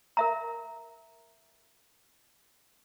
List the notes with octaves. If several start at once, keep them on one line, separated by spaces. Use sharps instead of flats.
A#4 E5 A#5